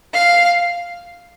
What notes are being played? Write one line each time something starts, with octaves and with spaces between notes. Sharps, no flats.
F5